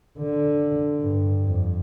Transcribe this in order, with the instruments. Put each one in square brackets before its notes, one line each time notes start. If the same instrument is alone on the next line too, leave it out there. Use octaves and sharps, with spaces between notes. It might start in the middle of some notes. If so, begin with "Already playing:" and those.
[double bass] D3
G2
F2